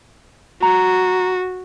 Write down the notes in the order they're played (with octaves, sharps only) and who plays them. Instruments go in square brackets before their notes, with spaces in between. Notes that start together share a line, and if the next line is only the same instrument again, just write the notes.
[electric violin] F#4 [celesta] A#5